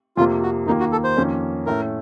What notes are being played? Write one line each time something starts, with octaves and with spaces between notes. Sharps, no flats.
F2 C3 F3 A#3 F4
F#4
D#2 D#3 A#3 D#4 F4
F#4
A4
C5
F2 D#3 A#3 C#4
A2 A3 C#4 A#4